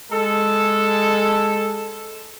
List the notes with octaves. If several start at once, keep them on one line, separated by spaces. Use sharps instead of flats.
G#3 A4